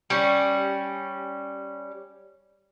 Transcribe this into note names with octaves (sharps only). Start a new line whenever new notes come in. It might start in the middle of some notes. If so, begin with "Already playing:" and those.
G3 C#4